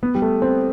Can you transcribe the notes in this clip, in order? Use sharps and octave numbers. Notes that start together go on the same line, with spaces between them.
B3
G3
A3
C4